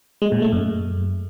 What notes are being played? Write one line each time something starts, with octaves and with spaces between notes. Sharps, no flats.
G#3
A#2
A3
F#2